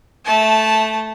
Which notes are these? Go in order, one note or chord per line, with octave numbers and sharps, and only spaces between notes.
A3 A5